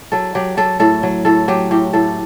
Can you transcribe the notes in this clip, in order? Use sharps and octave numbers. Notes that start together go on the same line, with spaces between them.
F#3 A4
F#3 G4
F#3 A4
A2 A4
F#3
A2 A4
F#3 G4
A2 G4
A2 A4